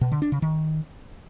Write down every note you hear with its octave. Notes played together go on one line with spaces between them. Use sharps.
B2
D3
D4
C#3
D#3